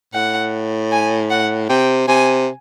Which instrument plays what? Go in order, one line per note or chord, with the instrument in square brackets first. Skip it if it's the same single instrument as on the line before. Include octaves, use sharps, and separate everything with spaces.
[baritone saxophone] A2 [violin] F#5
[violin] G#5
F#5
[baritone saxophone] C3 [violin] G5
[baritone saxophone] C3 [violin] G#5